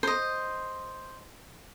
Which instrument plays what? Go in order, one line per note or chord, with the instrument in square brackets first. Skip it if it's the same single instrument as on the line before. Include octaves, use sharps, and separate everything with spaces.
[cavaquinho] C5 D#5